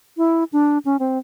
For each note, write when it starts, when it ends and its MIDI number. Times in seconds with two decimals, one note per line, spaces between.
0.17 0.44 64
0.53 0.78 62
0.85 0.97 61
0.99 1.18 60